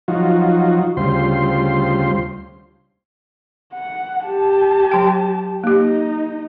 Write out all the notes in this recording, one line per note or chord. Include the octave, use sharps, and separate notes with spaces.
F3 F#3 D#4 F4 F#4
D2 C#3 G3 F4 C5 C6
F#5
G4 A5
F#3 G5
A#3 D#4 G4